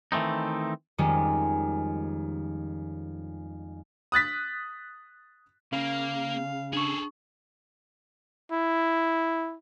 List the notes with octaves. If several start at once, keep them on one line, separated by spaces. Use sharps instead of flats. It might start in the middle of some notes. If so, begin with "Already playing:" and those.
D#3 E3 A3 C4 D#4
F2 D#3 G3 G#3 C#4
D#6 F#6 A6 B6
C#3 A#3 F5
D4 G#4 A4 C#6
E4